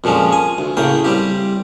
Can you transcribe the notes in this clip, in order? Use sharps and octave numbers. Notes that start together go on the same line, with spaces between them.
F2 A#2 F3 G#3 C#4
G#5
D2
A2 C#3 A#3 G5
G3 C4 G4